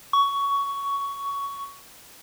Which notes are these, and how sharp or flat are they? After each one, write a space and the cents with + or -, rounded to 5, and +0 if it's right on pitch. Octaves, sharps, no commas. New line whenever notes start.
C#6 +15